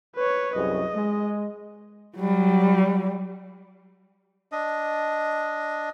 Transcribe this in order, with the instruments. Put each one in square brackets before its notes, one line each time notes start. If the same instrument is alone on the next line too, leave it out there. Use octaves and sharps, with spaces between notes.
[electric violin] B4 C#5
[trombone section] C2 F#2 G#4 [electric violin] D#5
[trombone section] G#3
[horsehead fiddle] F#3 G3
[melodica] D4 D#5